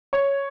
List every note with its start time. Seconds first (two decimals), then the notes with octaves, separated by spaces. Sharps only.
0.13 C#5